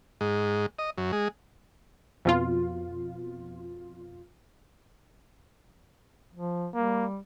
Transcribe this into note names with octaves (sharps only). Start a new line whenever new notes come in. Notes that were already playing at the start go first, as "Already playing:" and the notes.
G#2
D#5
F#2
G#3
F2 B2 F4
F3
G3 A#3